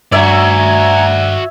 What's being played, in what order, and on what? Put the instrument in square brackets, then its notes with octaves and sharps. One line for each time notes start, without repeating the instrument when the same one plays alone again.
[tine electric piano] G2 [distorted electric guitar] F#4 D5 [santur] C#5 E5 [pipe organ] G#5 A#5 G#6